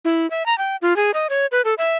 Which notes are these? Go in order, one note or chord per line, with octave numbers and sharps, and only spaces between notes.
E4
E5
A#5
G5
F4
G#4
D#5
C#5
B4
A4
E5